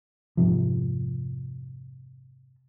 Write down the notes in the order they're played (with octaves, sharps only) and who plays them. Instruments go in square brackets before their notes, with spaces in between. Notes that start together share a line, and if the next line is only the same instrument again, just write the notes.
[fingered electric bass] F1 G#2 C3 F3